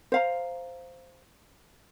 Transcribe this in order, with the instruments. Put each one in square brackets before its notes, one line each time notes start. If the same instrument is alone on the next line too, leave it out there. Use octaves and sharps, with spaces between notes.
[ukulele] C5 F5 A#5